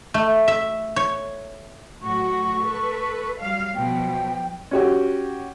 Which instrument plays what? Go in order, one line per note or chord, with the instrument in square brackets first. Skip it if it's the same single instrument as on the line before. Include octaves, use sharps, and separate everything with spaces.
[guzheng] A3
E5
C#5
[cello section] A2 F#3 F#4 [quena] C#6
[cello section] A4 B4
F#3 G3 F5
[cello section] B2 F3 F#3 [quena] G5
[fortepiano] C#4 F#4 G4